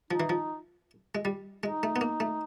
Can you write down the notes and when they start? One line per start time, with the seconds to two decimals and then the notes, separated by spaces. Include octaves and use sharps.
0.11 F3 D#4
0.20 E3
0.29 F3
1.15 G#3
1.25 G3
1.63 G#3 D#4
1.83 A3
1.96 B3
2.01 A#3
2.20 A3